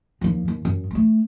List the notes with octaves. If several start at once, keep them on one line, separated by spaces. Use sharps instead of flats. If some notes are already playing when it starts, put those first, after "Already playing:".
D#2 F3
D#2
F#2
G#3 A3